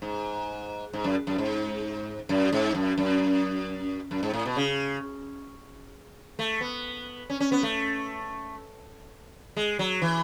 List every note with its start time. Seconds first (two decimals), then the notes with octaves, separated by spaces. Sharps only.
0.02 G#2
0.93 G#2
1.04 F#2
1.27 F#2
1.38 G#2
2.29 F#2
2.53 G#2
2.75 F#2
2.98 F#2
4.11 F#2
4.23 G#2
4.33 A2
4.46 B2
4.56 C#3
6.39 A3
6.61 B3
7.30 C#4
7.40 C#4
7.52 B3
7.63 A3
9.57 G#3
9.79 F#3
10.02 E3